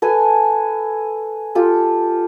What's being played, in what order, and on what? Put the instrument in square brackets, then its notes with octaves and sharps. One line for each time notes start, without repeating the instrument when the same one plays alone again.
[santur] A4 B4 G#5
F4 G4 A4